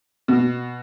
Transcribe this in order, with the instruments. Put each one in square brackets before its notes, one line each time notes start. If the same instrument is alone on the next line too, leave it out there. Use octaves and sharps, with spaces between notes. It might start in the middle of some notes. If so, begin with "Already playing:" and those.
[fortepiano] B2